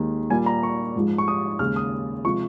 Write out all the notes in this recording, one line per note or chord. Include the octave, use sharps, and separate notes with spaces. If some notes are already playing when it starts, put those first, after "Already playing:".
Already playing: D#2 D#3 G#3
A#2 G3 A#3 G#5
A#5
C#6
G#2 F3 G#3
C#6
D#6
D#2 C#3 G#3 F6
D#6
C3 F3 G#3 C#6